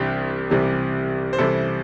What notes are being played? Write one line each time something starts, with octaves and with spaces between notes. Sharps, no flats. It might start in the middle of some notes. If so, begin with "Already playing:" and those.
Already playing: C2 C3 E3 G3 D4 G4
C2 C3 E3 G3
C5
C2 C3 E3 G3 E4 A4